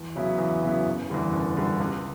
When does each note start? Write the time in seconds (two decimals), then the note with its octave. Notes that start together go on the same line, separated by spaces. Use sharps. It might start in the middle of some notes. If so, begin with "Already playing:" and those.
Already playing: E2
0.15 C#3 F#3 B3 E4
0.38 E2
0.63 C#3 F#3 B3 E4
0.86 F#1
1.10 E2 D3 G3
1.33 F#1
1.56 E2 D3 G3
1.80 C#2